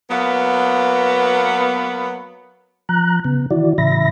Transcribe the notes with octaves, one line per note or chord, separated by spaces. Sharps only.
F#3 A#3 B3
F3 A#5 F#6
C#3 B3
D#3 E3 E4 F#4 D5
A2 C#3 E3 E5 B5 A#6